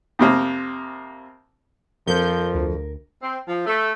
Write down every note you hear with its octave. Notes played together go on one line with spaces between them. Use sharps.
F2 C3 A#3
F2 F3 A#4 G6
D2
C4
F3
A3